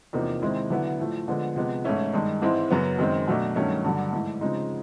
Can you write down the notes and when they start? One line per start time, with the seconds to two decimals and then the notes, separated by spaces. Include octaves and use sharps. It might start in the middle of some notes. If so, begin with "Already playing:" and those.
0.13 E2 C3 F3 A#3 D#4
0.42 C3 D#3 G#3 C4 E4
0.70 D3 F#3 B3 E4
0.99 A2 F3 A3
1.28 D3 F3 G#3 B3
1.56 C3 F3 G#3 B3
1.84 G#2 E3 A3 C#4 E4
2.13 G2 D#3 G#3
2.42 G#2 E3 G#3 C4 E4
2.70 F#2 C#3 F#3 B3
2.99 F#2 D#3 G#3 C4
3.28 B2 F#3 A3 D4
3.56 G2 D#3 F#3 A3 C#4
3.84 G2 D3 F#3
4.13 G#2 E3 A3
4.41 C#3 F3 G#3 C4 D#4